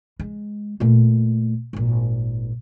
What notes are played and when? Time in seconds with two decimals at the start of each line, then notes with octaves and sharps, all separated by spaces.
0.20 G#3
0.80 A#2 A3
1.73 G#1 A#2